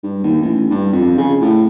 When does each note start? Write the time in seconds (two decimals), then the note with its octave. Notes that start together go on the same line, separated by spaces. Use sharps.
0.04 G2
0.24 D#2
0.41 A1
0.70 G2
0.92 F2
1.18 C#3
1.41 A2